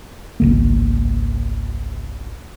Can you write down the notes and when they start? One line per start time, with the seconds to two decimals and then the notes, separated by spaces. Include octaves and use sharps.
0.40 G#1 C#2 A#3